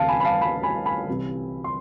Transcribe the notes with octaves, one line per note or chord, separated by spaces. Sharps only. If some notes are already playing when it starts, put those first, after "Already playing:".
Already playing: D2 C3 E3 F5 A5
G#5 B5
B5
F5 A5
G#5 B5
G#5 B5
G#5 B5
C2 C3 E3
C6